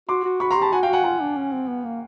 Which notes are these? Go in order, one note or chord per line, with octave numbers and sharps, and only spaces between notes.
F#4 C6 D6
F#4
F#4 B5 C#6
A#5 C6
G4
A5 B5
F#4 F#5 G#5
F5 G5
F#4
F#5 G#5
F4 F#5 G#5
D4
C#4
C4
B3
A#3